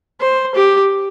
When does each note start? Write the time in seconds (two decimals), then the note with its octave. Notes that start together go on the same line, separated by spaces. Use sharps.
0.21 C5
0.55 G4